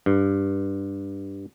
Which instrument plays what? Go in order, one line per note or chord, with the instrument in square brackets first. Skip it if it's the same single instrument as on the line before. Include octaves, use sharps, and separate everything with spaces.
[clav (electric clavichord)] G2